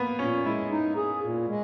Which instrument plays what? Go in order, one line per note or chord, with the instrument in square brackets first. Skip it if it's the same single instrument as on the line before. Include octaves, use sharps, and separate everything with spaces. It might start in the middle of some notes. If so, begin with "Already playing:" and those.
Already playing: [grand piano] A#3 B3
[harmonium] A#2 [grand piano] C#4
[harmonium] G#3 [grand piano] E4
[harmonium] D#4
G#4
A#2
G#3